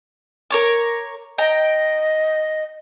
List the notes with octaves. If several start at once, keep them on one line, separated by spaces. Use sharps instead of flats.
A#4 C#5 D6
D#5 G5 A#5